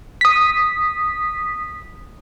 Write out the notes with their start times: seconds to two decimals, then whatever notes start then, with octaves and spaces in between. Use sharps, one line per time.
0.21 D#6 B6